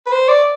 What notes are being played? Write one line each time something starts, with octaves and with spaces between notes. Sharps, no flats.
B4
C5
D5